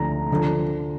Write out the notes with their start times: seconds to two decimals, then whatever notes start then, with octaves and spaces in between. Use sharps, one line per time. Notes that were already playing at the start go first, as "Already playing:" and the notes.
Already playing: D2 D3 F3 A#5
0.32 D3 F3